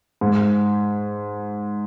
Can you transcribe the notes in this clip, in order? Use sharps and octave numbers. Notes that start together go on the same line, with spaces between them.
G#2